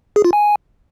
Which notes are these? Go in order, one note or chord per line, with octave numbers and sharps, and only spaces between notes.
G#4
F4
G#5